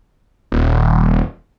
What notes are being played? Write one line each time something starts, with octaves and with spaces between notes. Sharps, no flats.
D#1